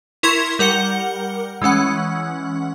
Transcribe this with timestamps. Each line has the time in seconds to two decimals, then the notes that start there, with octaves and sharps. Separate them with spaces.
0.23 E4 A#4 C6 C#6 G#6
0.59 G3 A#4 F#5 C#7 G7
1.62 E3 G#3 C#4 F#5